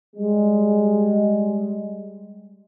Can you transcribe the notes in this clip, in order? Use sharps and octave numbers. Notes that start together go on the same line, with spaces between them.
G3 G#3